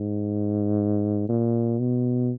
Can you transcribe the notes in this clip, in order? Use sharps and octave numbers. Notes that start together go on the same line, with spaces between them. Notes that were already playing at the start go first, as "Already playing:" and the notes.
Already playing: G#2
A#2
B2